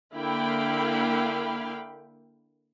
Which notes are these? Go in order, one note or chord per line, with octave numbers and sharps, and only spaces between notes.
D3 A#3 E4 F5 G5 B5